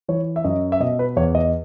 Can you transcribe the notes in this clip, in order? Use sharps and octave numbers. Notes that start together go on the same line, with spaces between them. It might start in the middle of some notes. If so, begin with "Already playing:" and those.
E3 C#5
E5
F#2 D#5
E5
B2 D#5
B4
E2 C#5
D#5